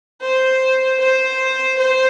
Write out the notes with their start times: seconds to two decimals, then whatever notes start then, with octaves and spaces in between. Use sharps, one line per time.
0.21 C5
1.00 C5
1.79 C5